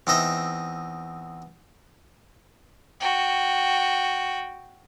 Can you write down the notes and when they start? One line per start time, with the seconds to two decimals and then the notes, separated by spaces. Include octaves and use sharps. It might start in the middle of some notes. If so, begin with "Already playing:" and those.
0.07 E2 C4 D#4 D#5 E5
3.00 F#4 G5